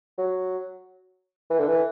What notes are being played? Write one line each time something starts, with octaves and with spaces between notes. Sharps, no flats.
F#3
E3
D3
E3